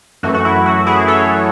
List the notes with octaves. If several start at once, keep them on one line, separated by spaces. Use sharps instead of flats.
F#2 E3 A3 F#4
F#4
E4
F#4
E4 G#4
A4 C#5